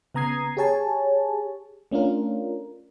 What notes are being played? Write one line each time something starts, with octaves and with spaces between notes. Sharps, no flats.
C#3 B3 A#5 D#6 G#6 C7
G4 G#4 C#5 G#5 A5
A3 C#4 D4 F4 A#4